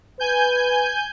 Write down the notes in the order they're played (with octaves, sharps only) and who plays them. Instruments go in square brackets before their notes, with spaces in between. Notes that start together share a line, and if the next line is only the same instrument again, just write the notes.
[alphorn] B4 [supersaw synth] G#5 G6